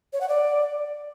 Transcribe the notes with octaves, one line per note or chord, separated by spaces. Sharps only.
C#5
F#5
D5